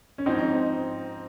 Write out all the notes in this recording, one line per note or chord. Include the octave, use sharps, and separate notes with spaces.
C#4
G#2 F3 C4 D#4